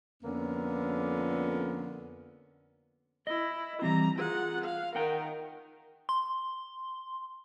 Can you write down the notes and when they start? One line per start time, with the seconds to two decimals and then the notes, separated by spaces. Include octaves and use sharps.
0.23 F2 D3 A#3 B3 C#4
3.27 E4 D#5
3.82 E3 G3 C4 A#5
4.19 F4 G#4 F#5
4.65 F5
4.95 D#3 A#4 F#5 G5 A#5
6.09 C6